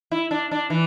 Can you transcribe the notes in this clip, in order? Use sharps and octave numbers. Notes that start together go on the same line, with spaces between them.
E4
D4
D4
E3